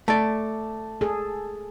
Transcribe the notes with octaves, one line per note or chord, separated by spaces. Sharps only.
A3 D5 A5
G#4 A4